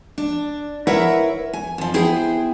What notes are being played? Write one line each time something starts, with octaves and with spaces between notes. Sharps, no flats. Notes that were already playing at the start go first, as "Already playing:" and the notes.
D4
E4 A#4 B4 C#5 E5 F#5
G#5
F2 F3
B3 E4 G#4 C5 G5